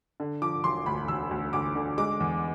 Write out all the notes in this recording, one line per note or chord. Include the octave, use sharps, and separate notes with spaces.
D3
F3 D6
E1 C6
D2 B5
E1 E6
D2
D2 D6
D3
G#3 D6
E2